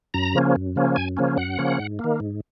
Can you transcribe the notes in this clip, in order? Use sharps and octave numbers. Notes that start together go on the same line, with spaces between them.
F#2 A#5
C#3 F3 A#3 C#4
F#2
C#3 F3 A#3 C#4
F#2 G#5
C#3 F3 A#3 C#4
F#2 F#5
C#3 F3 A#3 C#4
G#2
D#3 A#3
G#2